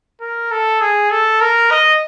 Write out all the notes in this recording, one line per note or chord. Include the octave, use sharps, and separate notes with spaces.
A#4
A4
G#4
A4
A#4
D#5